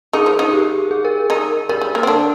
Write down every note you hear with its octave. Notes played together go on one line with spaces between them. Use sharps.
D#3 D#4 G#4
F3 F4
D#3 D#4
G4
G#4
A#4
D#3 D#4
G3 A#4
G3
A#3
C4
D3 D4